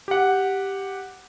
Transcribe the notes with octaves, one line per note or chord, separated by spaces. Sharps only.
G4 F#5